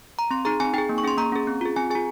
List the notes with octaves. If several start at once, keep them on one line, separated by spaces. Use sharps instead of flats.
A#5
C4 C6
D#4 G#4 A#5
C4 G#5
D#4 G#4 G5
A#3
C#6
C#4 G#4 C6
A#3 A#5
C#4 G#4
C4
F4 G#4
C4 G#5
F4 G#4 G#5